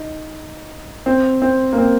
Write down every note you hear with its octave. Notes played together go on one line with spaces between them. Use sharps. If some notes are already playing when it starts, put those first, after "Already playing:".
Already playing: D#4
C4
C4
A#3
C4